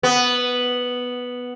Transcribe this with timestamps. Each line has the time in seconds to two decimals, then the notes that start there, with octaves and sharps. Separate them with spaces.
0.03 B3